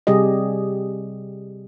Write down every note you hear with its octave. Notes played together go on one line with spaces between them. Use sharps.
C3 G3 G4 G#4 D#5